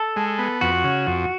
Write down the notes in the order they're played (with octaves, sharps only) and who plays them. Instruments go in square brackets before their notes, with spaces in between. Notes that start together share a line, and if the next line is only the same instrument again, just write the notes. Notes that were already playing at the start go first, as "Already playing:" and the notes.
Already playing: [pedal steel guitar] A4
[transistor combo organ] G#3
B3
[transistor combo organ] F2 [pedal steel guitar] F#4
[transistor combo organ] C#3
F2